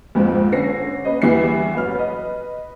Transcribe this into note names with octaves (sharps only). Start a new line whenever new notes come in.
F2 G#2 F3 C4
D3 C#4 A#6 C7
A#3 C#4 B4 D#5
E2 G2 E3 G3 E5 C7
A1 F#2 B4 F6
B4 D#5